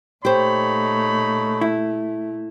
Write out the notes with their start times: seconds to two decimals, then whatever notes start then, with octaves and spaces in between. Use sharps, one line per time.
0.25 A#2 A3 D#4 G4 C5 C#5 B5
1.61 E4